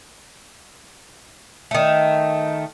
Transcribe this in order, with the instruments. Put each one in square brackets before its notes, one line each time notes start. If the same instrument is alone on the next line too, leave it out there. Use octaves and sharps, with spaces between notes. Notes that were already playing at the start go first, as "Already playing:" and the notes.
[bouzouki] D#3 A3